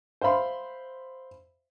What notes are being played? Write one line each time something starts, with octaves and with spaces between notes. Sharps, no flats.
C5 E5 F5 B5 C6